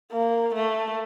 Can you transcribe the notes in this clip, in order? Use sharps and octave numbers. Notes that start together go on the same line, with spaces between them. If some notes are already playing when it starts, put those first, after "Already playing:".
A#3
A3